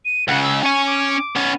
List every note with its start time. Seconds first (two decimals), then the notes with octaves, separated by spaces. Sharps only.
0.05 D#7
0.28 C#2 C#3 F#5
0.43 E6
0.63 C#4 G#5 C#6
0.87 D6
1.36 B3 C#4